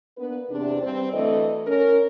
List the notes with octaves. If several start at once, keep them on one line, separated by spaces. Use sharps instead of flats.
A#3 B3 D4 B4
E2 C3 D4
G2 C4 C5
D2 E3 A3 A4 D#5
C#4 A#4